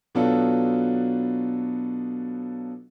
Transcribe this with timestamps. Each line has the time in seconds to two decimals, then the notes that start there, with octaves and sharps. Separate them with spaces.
0.15 B2 F#3 B3 D4 F4 A4